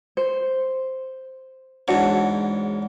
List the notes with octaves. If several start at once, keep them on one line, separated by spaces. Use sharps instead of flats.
C5
E2 G#2 D4 F#4 C#5